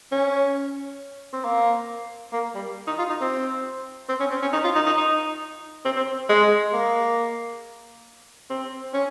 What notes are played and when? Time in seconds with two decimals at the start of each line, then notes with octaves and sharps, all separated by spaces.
0.12 C#4
1.33 C4
1.44 A#3
2.33 A#3
2.54 G3
2.87 D#4
2.99 F4
3.10 D#4
3.21 C4
4.09 C4
4.20 C#4
4.31 C4
4.42 C#4
4.53 D#4
4.64 F4
4.76 D#4
4.86 D#4
4.97 D#4
5.85 C4
5.97 C4
6.29 G#3
6.73 A#3
8.50 C4
8.94 C#4